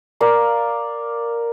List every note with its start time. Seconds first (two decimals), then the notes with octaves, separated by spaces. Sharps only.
0.21 A#4 D5 F5